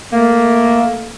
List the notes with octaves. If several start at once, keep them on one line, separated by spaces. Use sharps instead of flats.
A3 A#3